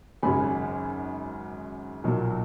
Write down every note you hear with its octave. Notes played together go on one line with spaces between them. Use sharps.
G#1 F#2 C#3 G#5 B5
B1 A#2 F#3